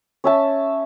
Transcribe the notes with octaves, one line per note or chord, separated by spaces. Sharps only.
C#4 E5 A5